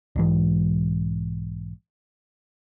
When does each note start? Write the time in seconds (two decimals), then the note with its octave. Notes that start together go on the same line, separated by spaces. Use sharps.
0.16 B1 G#2 E3